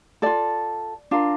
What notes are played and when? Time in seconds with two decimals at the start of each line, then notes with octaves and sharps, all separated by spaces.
0.22 F4 A4 D5
1.11 D4 F4 A#4